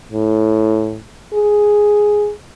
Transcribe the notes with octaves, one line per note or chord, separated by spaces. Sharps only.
A2
G#4